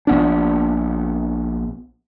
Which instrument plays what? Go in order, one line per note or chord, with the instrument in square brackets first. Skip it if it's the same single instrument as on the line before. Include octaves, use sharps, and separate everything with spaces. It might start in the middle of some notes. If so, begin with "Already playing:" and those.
[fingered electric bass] A#1 B3 D4